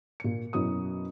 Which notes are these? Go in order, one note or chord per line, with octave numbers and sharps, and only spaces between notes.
A#2 C#7
F#2 B2 E4 F#4 D#6